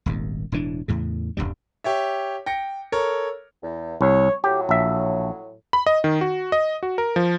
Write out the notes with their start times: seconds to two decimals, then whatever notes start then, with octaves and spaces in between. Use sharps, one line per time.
0.06 D#1 G#1 D#2
0.52 E1 A2 E3 D4
0.88 E2 A2 C#3
1.37 D#1 A#1 G2 G3
1.84 G4 C#5 E5
2.46 G5 A#6 C#7
2.92 A4 A#4 C#5
3.62 E2
4.01 C2 C#5
4.44 A2 F#3 G4
4.69 A#1 E5
5.73 B5
5.86 D#5
6.04 D#3
6.21 F#4
6.52 D#5
6.83 F#4
6.98 A#4
7.16 F3